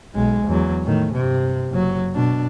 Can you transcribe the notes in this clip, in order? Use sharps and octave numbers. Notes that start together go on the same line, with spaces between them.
B1 G#3
E2 F#3
A2 D#3
G2 C3
F#1 F#3
B2 D4